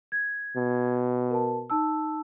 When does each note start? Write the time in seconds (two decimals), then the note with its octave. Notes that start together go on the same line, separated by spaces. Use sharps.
0.12 G#6
0.56 B2
1.31 A#4 A5
1.70 D#4 A5 E6